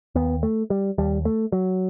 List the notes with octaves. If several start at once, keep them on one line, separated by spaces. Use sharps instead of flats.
D#2 B3
A3
G3
D#2 G3
A3
F#3